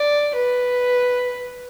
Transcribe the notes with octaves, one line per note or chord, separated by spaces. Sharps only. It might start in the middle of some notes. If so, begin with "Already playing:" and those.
Already playing: D5
B4